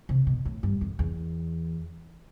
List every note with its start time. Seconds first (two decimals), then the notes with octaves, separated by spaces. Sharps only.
0.09 C3
0.27 B2
0.45 A2
0.63 G2
0.81 F2
0.99 E2